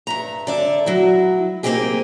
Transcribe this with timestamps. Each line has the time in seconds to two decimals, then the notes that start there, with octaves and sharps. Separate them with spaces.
0.07 G2 E5 A#5
0.47 D3 D5 E5
0.86 F#3 E4
1.63 A#3 C4 C#4 D#4 G4 G#4